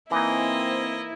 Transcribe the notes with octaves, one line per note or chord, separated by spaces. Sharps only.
E3 A#3 C4 D#4 E4 D#5